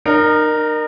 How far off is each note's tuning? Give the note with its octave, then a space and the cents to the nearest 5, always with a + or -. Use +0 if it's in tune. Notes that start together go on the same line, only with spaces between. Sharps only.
D#4 -35 A#4 +0